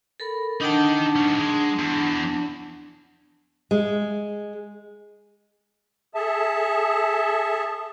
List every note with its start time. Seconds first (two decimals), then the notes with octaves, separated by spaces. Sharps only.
0.20 A4 A#4 B5
0.61 D4 D#4 F#5 G5 A5
1.16 D#3 C#4
1.39 G#3
1.79 E2
3.71 G#3
6.14 G#4 A4 E5 A5